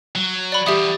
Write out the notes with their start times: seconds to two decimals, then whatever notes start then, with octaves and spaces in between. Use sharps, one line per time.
0.15 F#3
0.52 D5 B5
0.67 E2 G3 G4 E5 D#6